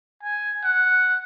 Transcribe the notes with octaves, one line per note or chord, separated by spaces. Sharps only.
G#5
F#5